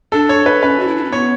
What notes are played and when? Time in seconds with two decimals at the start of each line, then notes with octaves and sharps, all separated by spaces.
0.12 D4 A4
0.29 C#5
0.46 B4
0.62 C#4 B4
0.80 F#4
0.88 E4
0.96 D4
1.04 C#4
1.12 B3 C#5